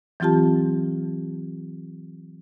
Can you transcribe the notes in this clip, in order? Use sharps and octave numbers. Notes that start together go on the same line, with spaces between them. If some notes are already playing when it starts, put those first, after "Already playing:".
E3 F#3 C4 F4 G4 A5